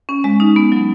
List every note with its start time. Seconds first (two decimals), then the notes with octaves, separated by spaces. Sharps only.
0.09 C#4
0.24 G#3
0.40 D#4
0.56 B3
0.72 F#3